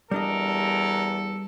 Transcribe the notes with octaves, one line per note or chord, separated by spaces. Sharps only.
E2 G3 D4 A4 A#4 D#5